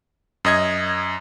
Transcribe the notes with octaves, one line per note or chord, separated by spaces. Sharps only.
F#2 D#5 G#6